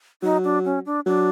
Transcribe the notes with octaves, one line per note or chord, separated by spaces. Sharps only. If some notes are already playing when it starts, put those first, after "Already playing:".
F#3 D#4
D4
C#4
D4
F#3 D4